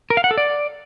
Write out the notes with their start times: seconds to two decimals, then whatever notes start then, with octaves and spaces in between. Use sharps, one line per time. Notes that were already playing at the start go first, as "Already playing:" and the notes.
0.10 A#4
0.17 F5
0.24 F#5
0.31 A4
0.38 D5